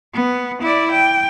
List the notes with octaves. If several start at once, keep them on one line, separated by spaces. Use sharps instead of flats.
B3
E4 D5
G5